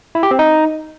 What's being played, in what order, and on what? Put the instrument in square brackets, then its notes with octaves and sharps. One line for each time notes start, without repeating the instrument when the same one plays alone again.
[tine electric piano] E4
G4
C4
D#4